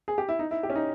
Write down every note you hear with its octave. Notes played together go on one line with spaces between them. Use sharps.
G#4
G4
E4
D#4
E4
G4
C#4
D#4